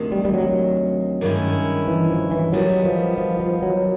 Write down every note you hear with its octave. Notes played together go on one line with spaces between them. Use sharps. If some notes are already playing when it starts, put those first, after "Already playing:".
Already playing: D2 C3 D#3
G3
G3
F#3
G2 D#3 G#3 C#4 E4
E3
F3
E3
D#3 F#3 G3 B3
F3
F3
F3
F#3